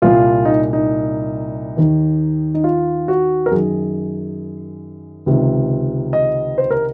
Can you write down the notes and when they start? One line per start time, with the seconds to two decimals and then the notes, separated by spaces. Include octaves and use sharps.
0.02 C2 A#2 F4
0.45 D#4
0.73 D#4
1.77 D#2 D#3
2.54 D#4
2.64 F4
3.08 F#4
3.46 A#4
3.51 F#2 D#3 G#4
5.26 C#2 C3 D#3
6.13 D#5
6.58 C5
6.71 A#4